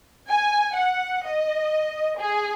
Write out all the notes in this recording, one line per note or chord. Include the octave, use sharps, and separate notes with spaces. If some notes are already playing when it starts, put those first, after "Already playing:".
G#5
F#5
D#5
G#4